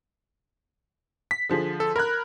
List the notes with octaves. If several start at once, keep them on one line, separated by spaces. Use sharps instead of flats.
B6
D3 F3 G#4
A4
A#4 B5 F#6 G#6